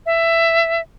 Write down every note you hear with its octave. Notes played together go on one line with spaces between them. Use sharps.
E5